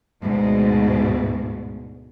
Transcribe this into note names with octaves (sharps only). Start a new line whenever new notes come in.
D2 G#2 B2